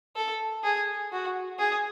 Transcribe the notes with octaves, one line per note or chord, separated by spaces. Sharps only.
A4
G#4
F#4
G#4